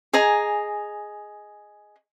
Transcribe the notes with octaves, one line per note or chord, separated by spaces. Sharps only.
G#4 D#5 G#5 A#5